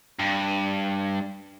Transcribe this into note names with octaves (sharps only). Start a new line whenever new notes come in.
G2